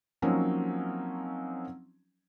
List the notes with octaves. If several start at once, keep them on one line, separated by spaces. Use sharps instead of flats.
F3 F#3 A#3 C4 C#4 D#4